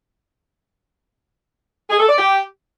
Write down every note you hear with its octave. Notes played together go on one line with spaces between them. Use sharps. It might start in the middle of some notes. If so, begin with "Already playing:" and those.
G#4
A4
D5
G4